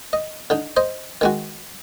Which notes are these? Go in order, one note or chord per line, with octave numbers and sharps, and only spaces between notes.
D#5
D3 D#4
C5 D#5
D#3 G#3 F#4